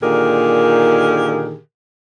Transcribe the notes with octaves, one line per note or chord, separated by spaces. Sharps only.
A#2 D3 D#3 G4 G#4 A#4